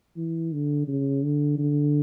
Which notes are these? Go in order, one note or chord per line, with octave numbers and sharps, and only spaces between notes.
E3
D3
C#3
D3
D3